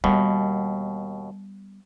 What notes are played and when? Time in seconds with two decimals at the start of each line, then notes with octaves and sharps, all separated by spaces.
0.04 D#2 B2 G3 B3